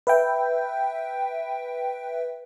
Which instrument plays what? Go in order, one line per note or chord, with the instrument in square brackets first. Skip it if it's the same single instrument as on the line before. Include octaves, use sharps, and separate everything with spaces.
[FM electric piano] B4 E5 G5